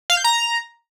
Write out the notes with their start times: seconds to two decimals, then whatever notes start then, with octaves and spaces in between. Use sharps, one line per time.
0.10 F5
0.17 G6
0.24 A#5